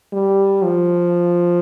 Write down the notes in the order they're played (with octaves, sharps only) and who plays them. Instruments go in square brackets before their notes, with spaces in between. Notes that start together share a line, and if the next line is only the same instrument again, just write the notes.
[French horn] G3
F3